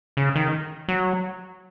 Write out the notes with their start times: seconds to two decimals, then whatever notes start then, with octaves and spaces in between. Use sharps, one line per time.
0.17 C#3
0.36 D#3
0.88 F#3